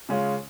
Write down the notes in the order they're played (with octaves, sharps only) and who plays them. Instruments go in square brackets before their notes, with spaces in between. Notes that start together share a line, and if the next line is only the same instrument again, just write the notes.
[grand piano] C#3 G#3 C#4 F4